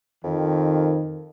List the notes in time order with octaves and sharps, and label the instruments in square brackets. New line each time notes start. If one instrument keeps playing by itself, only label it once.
[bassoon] F2 [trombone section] D#3